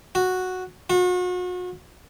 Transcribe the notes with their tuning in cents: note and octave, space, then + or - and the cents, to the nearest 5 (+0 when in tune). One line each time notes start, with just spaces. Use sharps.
F#4 -5
F#4 -40